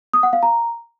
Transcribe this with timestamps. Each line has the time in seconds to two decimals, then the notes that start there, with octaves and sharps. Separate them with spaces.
0.13 D#6
0.23 F#5
0.33 F5
0.43 A#5